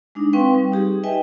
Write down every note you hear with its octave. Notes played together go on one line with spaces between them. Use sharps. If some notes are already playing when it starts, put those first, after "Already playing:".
G#3 D4 D#4
C4 B4 F5 G5 C6 C#6
G3
D#4 G4 G#4
B4 D#5 E5 G5 G#5